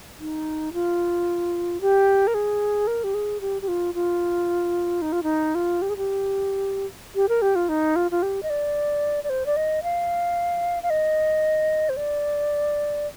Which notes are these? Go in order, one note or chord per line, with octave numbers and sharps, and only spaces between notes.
D#4
F4
G4
A#4
G#4
A#4
G4
G#4
G4
G4
F4
F4
D#4
F4
D#4
F4
G4
G#4
G4
G4
A#4
G4
F4
D#4
F4
F4
G4
D#5
D5
D5
C5
D5
D#5
F5
F5
D#5
C5
D5